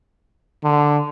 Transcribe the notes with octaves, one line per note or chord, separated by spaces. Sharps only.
D3